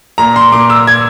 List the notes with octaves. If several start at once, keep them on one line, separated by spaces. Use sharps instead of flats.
A#2 A#5
C6
A#2 D6
E6
G#6